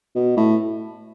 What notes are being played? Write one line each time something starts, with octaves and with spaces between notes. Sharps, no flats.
B2
A2